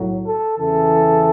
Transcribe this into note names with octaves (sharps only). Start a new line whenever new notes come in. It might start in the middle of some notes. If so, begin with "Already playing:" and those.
Already playing: B1 A2 F#3
A4
E2 C#3 E3 A4